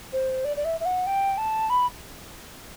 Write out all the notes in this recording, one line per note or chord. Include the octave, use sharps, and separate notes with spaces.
C5
D5
D5
E5
E5
F#5
G5
A5
B5